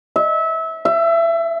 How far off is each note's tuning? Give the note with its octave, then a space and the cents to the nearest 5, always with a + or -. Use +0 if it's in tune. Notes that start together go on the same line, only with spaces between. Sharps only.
E5 -25
E5 +25